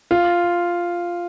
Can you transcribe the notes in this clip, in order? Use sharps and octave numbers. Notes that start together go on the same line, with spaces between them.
F4